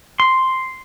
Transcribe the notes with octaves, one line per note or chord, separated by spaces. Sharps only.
C6